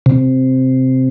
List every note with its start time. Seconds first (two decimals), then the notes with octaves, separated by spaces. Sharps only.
0.06 C3